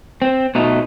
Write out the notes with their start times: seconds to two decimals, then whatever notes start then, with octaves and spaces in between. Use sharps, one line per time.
0.22 C4
0.55 B2 A3 D#4